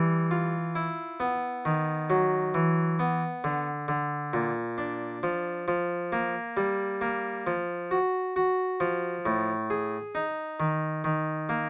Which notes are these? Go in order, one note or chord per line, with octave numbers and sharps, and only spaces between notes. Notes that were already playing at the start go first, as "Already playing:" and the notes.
Already playing: E3 G3
F4
E4
B3
D#3
F#3
E3
B3
D3
D3
A#2
D4
F3
F3
A#3
G3
A#3
F3
F#4
F#4
F3
A2
G#4
D#4
D#3
D#3
A#3